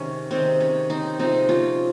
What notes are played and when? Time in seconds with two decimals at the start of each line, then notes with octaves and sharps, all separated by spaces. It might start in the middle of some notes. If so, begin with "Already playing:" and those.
Already playing: C3 D#3 G#3 C#4
0.31 C3 D#3 G#3 C4
0.60 C#4
0.90 C4 D#4
1.19 C3 F3 G#3 C4 D#4
1.49 C#4 F4